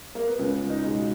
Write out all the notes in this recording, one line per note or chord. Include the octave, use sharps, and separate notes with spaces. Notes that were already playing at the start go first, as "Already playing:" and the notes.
A#3
B3
C#2 C#4
D#4
B2 G#3